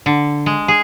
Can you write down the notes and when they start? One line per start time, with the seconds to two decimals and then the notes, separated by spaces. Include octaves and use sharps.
0.06 D3
0.46 G#3
0.68 G#4